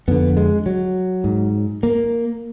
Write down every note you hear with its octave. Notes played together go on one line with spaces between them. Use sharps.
F2 D3 B3
G#3
F#3
G#2
A#3